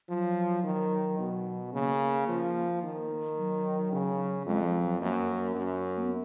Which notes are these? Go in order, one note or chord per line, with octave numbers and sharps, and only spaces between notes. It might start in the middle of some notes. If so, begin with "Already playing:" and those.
F3 F#3
D#3
B2
C#3 A#3
F3
D#3
F#3
C#3
F2 G#3
F3
F#3
F#2 A#3
F#2
A#3
B3